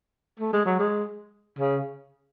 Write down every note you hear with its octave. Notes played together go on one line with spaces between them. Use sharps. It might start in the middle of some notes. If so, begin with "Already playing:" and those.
A3
G#3
F#3
G#3
C#3